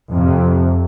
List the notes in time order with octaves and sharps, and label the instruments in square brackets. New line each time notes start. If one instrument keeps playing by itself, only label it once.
[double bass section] F2 C3